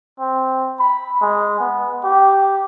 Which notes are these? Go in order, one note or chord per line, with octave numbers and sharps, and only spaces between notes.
C4
B5
G#3
B3
G4